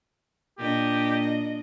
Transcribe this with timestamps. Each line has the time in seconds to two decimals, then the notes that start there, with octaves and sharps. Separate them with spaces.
0.58 A#2 D4 G4 D#5